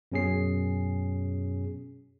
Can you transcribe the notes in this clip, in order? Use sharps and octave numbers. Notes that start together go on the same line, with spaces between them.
F#2 B2 C#4 G#4 C7